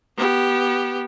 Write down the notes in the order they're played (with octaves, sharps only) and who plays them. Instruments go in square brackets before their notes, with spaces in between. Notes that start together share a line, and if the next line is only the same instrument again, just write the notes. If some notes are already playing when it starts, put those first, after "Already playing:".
[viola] B3 G4